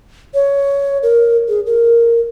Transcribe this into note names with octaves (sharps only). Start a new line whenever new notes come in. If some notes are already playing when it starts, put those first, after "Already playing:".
C#5
A#4
G#4
A#4